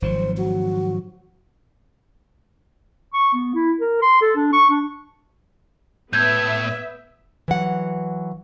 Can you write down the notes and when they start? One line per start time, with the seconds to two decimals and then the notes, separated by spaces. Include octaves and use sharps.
0.02 G#1 F3 F#3 C5
0.38 F#4
3.14 C#6
3.34 B3
3.55 E4
3.80 A#4
4.02 C6
4.21 A4
4.36 D4
4.53 C#6
4.70 D4
6.13 A2 B3 E5 G6 G#6
7.48 E3 F#3 F#5